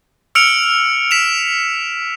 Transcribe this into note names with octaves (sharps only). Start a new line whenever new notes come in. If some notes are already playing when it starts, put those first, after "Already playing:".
E6 F6 C#7 D7 F7
B6 E7 F7